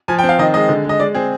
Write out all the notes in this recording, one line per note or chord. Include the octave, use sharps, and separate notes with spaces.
F3 G#5
G5
C4
F5
D#3 D#5
G#3 D#5
D3
G#3 D#5
G#3 D5
C4 G#4